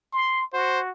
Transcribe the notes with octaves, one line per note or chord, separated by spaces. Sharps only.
C6
F#4 C5